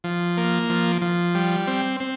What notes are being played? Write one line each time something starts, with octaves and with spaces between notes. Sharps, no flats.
F3
A#3
F3
F3
G3
C4
C4